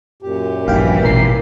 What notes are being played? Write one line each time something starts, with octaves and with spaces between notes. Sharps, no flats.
F#2 A#2 G4
A#1 G2 E3 F5 G5
A1 B2 A#4 C7